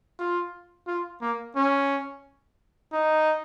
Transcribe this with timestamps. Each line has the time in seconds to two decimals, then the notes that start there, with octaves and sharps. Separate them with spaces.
0.19 F4
0.87 F4
1.21 A#3
1.56 C#4
2.93 D#4